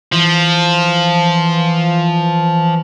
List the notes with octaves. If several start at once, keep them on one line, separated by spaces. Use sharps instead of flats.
E3 F3